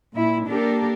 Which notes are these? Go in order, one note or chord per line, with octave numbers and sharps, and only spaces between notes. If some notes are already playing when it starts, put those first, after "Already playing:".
A#2 E4
A#3 D4 G4 A4 A#4